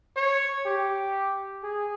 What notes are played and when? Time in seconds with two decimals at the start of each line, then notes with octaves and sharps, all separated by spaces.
0.17 C#5
0.66 G4
1.64 G#4